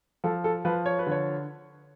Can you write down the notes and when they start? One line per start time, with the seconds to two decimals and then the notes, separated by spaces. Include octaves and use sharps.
0.24 F3 A4
0.44 A4
0.65 F3 B4
0.86 C#5
0.99 B4
1.07 D3 C#5